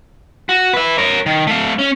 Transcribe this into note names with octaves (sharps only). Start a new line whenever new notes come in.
F#4
B4 E5
A#4 C#5
D#3
A3 F5
C#4